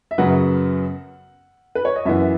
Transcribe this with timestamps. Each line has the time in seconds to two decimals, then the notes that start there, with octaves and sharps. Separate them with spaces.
0.11 E5
0.18 F#2 C#3 F#3 B3 F#5
1.75 B4
1.85 C#5
1.96 D#5
2.05 F#2 E3 B3 E5